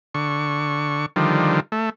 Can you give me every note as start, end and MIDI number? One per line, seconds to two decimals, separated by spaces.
0.15 1.06 50
0.15 1.06 85
1.16 1.60 50
1.16 1.60 51
1.16 1.60 53
1.16 1.60 55
1.72 1.90 57